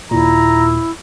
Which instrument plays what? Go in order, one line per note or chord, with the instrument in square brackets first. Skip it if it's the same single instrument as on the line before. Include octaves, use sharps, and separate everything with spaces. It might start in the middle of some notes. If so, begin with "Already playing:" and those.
[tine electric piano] D#2 A#2 [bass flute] E4 [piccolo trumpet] A#5